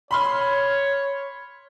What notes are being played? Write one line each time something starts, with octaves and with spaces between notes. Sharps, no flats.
C#5 B5 C6 F6